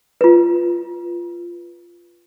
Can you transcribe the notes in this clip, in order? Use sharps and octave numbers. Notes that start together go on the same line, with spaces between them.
F4 B4